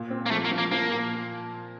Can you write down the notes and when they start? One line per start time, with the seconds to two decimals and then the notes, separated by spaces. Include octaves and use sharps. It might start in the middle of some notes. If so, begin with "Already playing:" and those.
Already playing: A#2
0.10 C4
0.26 A#3
0.31 F3 A3
0.45 A#3
0.51 F3
0.58 A#3
0.71 F3 A#3
0.91 A#2